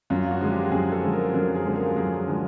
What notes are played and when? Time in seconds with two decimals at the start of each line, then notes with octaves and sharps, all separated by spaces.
0.10 F#2 F4
0.31 F#4
0.40 D3 F3 G#3
0.52 G4
0.71 F#2 G#4
0.92 A4
1.03 D3 F3 G#3
1.13 A#4
1.34 F#2 A#4
1.55 G#4
1.65 D3 F3 G#3
1.76 A#4
1.96 F#2 G#4
2.27 D3 F3 G#3